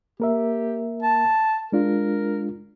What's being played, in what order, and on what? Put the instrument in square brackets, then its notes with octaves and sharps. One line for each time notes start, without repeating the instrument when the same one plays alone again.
[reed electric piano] A#3 A#4 E5 [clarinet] G4
[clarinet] A5
[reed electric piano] G#3 D4 F4 [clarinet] A#4